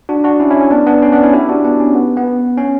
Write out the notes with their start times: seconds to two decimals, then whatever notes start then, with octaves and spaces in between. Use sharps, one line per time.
0.09 D4 F#4
0.24 D4 F#4
0.40 C#4 E4
0.50 C#4 E4
0.61 C#4
0.71 B3 D4
0.87 B3 D4
1.02 C#4
1.12 B3 D4
1.23 C#4 E4
1.33 E4 G4
1.49 D4 F#4
1.64 B3 D4
1.80 C#4
1.95 B3
2.17 B3
2.57 C#4